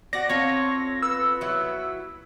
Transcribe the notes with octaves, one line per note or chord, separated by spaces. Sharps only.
F#4 D5 A#6
C4 F4 A4 C#5
B3 E6
F#3 E4